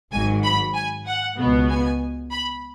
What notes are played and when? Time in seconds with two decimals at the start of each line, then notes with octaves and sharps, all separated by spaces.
0.12 G#1 G#2 F#3 G#5
0.43 B5
0.75 G#5
1.06 F#5
1.37 C#2 B2 B3
1.69 G#5
2.32 B5